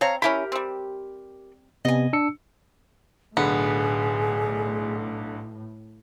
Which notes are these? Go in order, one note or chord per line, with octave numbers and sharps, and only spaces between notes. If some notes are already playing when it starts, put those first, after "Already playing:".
C4 C#5 F5 A#5
C#4 E4 G4 A#4 B5
G3 C4
C3 B3 D#5 G#5
D4 E6 C#7
B1 A2 D3 B3 G#4